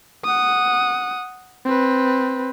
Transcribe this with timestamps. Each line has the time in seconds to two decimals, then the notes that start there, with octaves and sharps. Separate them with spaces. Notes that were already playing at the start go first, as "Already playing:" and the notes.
0.24 F#5 D#6
1.65 C4 B4